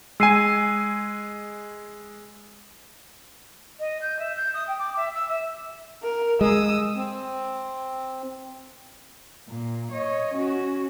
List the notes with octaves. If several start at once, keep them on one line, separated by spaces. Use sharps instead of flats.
G#3 G#5 E6 C7 D#7
D#5
G6
E5
G6
D#6
G5
D6
E5
E6
E5
A#4
G#3 D#6 E6
C4
A#2
C#5 D#5
C#4 F#4